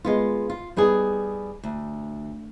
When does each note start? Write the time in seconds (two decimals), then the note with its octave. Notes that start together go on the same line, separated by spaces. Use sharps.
0.05 G#3 B3 F4
0.50 F4
0.77 G3 B3 D#4 G#4
1.64 D2